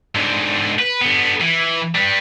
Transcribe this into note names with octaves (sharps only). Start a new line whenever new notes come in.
G#2 D3
B4
D3 B3
E3
G3 B4